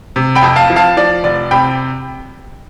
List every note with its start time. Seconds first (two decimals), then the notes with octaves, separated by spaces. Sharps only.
0.16 C3
0.35 G5 B5
0.43 F2
0.56 F5 A5
0.70 F3
0.76 F5 A5
0.97 F3 D5
1.24 F1 D5
1.51 C3 G5 B5